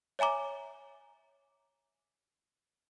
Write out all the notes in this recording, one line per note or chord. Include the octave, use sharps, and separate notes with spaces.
C#5 E5 G#5 A#5 D6